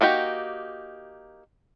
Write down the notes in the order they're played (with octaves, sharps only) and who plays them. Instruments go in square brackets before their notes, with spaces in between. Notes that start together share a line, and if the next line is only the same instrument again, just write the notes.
[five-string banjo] A#3 D#4 F#4 G4